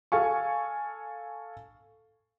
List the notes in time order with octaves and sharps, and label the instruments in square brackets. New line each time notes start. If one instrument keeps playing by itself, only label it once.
[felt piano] A4 F5 G#5 C#6